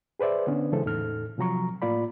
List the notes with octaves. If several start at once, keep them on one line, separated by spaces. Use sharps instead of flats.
G#4 B4 C5 D5 E5
D3 B3 C#4 D4
C#3 E3 G#3 A4 C5
E2 A2 D#4 A4 F6
C3 F3 F#3 A#5 C#6
A2 A#3 F4 D5 B5